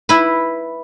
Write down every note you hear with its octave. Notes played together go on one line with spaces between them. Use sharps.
E4 B4